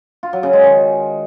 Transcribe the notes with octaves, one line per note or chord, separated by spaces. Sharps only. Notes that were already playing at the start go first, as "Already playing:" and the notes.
F4
F#3
C#3
G#3
D#3